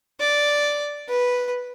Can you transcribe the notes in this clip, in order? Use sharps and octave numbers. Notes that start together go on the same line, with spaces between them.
D5
B4